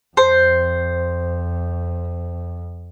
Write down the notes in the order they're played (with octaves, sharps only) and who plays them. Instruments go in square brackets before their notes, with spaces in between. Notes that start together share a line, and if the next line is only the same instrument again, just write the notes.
[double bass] F2 [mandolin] C5